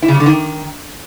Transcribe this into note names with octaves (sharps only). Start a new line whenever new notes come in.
E4
C#3
G3
D3
D#3